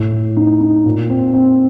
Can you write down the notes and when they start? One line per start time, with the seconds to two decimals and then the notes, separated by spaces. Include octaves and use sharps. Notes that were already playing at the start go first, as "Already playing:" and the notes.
Already playing: A2
0.13 A3
0.37 D#4
0.60 D#4
0.86 A#2
1.10 C4
1.34 C4